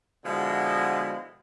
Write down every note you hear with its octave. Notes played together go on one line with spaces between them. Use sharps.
B2 D3 F3 G#3 E4